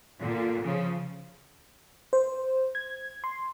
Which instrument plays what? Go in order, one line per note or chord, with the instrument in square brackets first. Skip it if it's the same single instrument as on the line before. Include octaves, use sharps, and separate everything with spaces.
[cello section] A#2 D3
C#3 F3
[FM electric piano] C5
G#6
C6